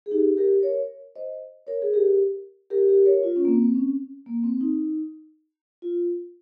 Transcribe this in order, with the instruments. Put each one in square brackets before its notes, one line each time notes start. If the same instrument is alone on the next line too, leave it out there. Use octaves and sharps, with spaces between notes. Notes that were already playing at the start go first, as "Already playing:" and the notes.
[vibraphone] G#4
D#4 G4
G4 A#4
A#4 C#5
C5 D#5
A#4 C#5
G#4
G4 A#4
G4 A#4
G4 A#4
A#4 C#5
F4
C#4
A#3
C4
C4
C#4
A#3
C4
D#4
F4